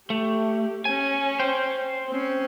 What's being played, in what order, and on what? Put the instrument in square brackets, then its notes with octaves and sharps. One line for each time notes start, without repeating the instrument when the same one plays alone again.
[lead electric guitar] A3 [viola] G4
[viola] C#4 [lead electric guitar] G#5
[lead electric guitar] C5 G5
[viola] C4 C#4